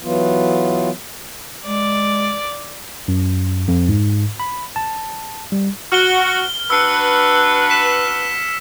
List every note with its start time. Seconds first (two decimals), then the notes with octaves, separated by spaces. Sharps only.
0.01 E3 F#3 B3 F4
1.66 G#3 D5
3.08 F#2
3.68 F2
3.89 G#2
4.40 B5
4.76 A5
5.52 G3
5.92 F#4 F6 G7
6.70 D4 F#4 B4 E6 C#7
7.70 B6 E7